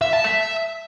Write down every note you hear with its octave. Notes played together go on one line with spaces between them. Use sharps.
E5
A5
E5